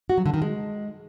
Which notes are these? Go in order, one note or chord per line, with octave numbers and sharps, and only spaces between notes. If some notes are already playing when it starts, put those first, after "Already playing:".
F#4
F#3
D3
D#3
G#3